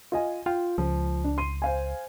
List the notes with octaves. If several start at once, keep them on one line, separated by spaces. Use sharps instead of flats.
F4 D#5 G#5
F4 G5
C#2 F3
D4
C6 D#7
C5 F5 G#5